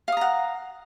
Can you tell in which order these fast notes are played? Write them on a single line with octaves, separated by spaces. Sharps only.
F5 D#6 A#5 F#5